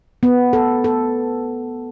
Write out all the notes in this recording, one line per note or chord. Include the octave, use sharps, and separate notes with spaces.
B3
A4
A4